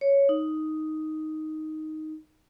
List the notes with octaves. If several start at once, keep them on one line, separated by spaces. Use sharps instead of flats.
C#5
D#4